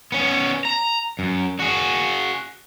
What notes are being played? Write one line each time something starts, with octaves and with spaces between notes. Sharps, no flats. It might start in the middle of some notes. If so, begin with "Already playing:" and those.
B3 C#4
A#5
F#2
F#4 G#4